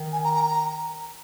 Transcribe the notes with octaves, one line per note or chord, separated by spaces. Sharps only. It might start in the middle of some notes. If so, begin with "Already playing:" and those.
Already playing: D#3
G#5
A#5
A#5
A#5